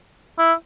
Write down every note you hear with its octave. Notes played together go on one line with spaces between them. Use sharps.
E4